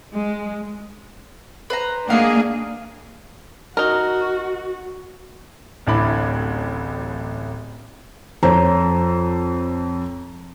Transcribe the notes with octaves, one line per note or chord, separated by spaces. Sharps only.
G#3
B4 C5 A#5
A#3 D4 D#4 G#4 F5 F#5
D#4 F#4 A#4
D1 A1 D4 E4 B5
F2 C5 C#5 A#5